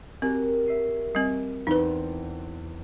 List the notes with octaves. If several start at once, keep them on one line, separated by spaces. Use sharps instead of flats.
C4 F#4 G4 A#4
E5 C7 D#7
G3 C4
E2 C4 D#4 B4